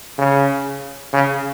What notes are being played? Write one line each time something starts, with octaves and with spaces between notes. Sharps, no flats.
C#3
C#3